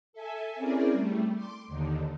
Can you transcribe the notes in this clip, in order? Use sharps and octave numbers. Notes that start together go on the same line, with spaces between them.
A4 E5 G#5
C4 C#4 E4 G#4 A#4 D5
G3 A3
C6 D6
D#2 D3 D#3